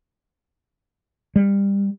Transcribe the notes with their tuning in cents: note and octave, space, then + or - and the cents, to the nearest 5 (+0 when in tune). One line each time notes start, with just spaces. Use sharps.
G3 +25